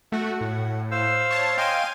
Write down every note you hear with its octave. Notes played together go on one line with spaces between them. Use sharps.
A3 F#4 F#5
A2
C5 F5 E6
C#5 A5
D#5 F5 G5 G#5 C6 D#7